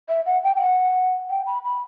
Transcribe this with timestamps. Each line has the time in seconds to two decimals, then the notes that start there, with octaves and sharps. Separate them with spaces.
0.09 E5
0.26 F#5
0.43 G5
0.56 G5
0.61 F#5
1.30 G5
1.46 B5
1.64 B5